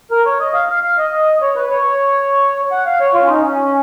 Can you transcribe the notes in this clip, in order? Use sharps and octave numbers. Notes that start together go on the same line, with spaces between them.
A#4
C#5
D#5
F5
F5
F5
D#5
C#5
B4
C#5
F#5
F5
C#5
F4
C#4
D#4
C#4